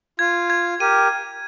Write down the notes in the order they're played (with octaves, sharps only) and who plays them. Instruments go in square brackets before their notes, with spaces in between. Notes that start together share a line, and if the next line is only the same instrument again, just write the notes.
[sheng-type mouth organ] F4 [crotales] G#6
[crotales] G#6
[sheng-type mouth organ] G4 A#4 [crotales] D#7